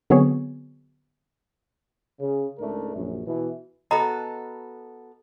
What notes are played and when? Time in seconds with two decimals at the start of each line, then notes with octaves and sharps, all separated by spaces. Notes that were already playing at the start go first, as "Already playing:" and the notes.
0.10 D3 F#3 B3 C4 G#4 C#5
2.20 C#3
2.59 C#2 G#2 A3 D4 A#4
2.95 A#1 F#2
3.27 B2 E3
3.91 B3 F#4 A4 D#5 A#5 B5